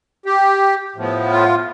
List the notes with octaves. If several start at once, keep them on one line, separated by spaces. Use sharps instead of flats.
G4
A2 F3 B3
F4